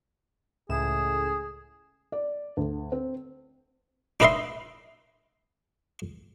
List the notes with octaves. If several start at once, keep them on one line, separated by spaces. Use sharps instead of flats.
C#2 A2 G#4 E7
D5
D2
C4
D4 D#4 B4 D#5 E5 C6